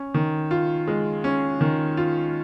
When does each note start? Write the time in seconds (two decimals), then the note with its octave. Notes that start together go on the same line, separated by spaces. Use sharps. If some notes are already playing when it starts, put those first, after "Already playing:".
Already playing: C#4
0.14 D#3
0.51 F4
0.88 G#3
1.24 C#4
1.61 D#3
1.97 F4